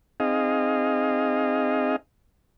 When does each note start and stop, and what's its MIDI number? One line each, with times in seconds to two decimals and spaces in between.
0.20 1.96 60
0.20 1.96 63
0.20 1.96 68
0.20 1.96 75
0.20 1.96 77